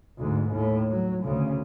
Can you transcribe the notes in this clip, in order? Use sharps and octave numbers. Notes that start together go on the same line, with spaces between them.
D2 G#2
D#2 A2
F#3
D2 C#3